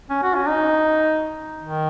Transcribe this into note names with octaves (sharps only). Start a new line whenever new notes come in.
C#4
F#4
C#4
D#4
D#3